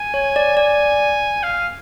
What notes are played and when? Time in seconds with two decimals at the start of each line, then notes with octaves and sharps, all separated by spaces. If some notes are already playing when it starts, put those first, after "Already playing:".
Already playing: G#5
0.14 C#5
0.36 D5
0.57 D5 G#5
1.43 F5